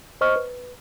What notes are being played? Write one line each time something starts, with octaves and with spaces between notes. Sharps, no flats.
C5 D#5 C#6 F6
B4